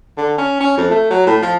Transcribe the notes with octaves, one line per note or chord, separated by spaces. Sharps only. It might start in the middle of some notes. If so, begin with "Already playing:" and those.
D3
C#4
C#4
F2
A3
F#3
A2
F3